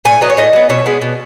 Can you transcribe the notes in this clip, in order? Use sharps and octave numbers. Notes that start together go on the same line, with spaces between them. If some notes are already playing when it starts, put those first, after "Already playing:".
A2 G#5
F#3 B3 D#5
C#5
A2 D#5
F#3 B3
B2 C#5
G#3 B3
B2